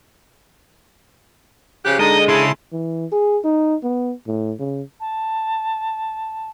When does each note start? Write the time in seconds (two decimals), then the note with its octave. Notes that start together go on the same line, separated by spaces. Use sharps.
1.85 C#3 F3 G4 F#6
1.99 D3 G#3 D#4 D#5 A5
2.28 C#3 E4 G#4 A5 C6
2.72 E3
3.12 G#4
3.44 D#4
3.83 B3
4.27 A2
4.59 C#3
5.00 A5